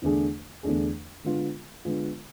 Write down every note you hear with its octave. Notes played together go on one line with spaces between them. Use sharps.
E2 D3 A3 D4 G#4
E2 D3 A3 D4 G#4
D3 G#3 B3 F4
D3 G#3 B3 F4